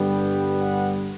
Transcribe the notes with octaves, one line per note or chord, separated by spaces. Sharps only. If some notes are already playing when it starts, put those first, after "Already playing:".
Already playing: G2 D3 G3 B3
G5
F#5